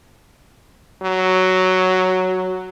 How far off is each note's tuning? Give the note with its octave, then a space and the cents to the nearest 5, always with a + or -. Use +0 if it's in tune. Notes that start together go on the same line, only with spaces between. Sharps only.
F#3 +5